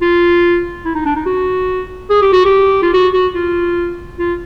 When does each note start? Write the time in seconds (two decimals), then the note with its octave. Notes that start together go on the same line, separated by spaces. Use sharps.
0.02 F4
0.85 E4
0.95 D#4
1.06 D4
1.16 D#4
1.26 F#4
2.10 G#4
2.22 G4
2.33 F#4
2.45 G4
2.83 F4
2.94 F#4
3.14 F#4
3.35 F4
4.19 F4